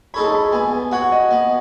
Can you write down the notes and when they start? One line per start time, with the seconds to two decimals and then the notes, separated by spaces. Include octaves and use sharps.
0.14 G#3 D#4 A4 C#5 B5
0.24 A5
0.35 B5
0.53 B3 G#5
0.73 G#5
0.91 F#4 C#5 F#5
1.12 D#5
1.31 B3